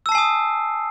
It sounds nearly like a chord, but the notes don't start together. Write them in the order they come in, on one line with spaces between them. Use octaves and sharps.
E6 A5 C7 G#5 D#6